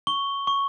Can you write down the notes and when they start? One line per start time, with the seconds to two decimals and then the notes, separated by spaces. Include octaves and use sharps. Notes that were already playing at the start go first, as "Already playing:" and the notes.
0.07 C#6 G7
0.47 C#6